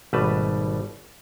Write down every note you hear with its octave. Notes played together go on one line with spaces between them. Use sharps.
G#1 B2 G3 A3 B4 A5